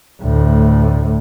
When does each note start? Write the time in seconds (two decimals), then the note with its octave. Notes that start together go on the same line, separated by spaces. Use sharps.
0.22 D2 A2